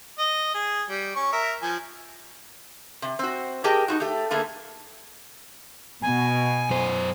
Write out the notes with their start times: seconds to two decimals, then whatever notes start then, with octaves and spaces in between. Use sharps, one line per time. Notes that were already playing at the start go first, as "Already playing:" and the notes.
0.18 D#5
0.54 G#4
0.90 G3
1.16 C#4 C#6
1.33 A#4 E5
1.62 F3 G#5
3.02 C3
3.19 C4 F#4
3.64 G4 G#4 A#4 D#5 G5 A5
3.88 D#4 F4 F#4
4.00 A3 G4
4.31 D3 A3 A#3 G#4
6.02 B2 G#5
6.70 F#2 C5